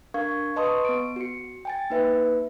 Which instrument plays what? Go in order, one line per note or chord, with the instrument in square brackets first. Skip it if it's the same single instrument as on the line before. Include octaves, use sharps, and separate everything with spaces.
[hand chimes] D4 A#4 F5 C#6 G#6
B4 D#5 A5 C6 C#6 D#6
B3 D7
F#4 C#7
G5 G#5 A6
A#3 D#4 B4 E5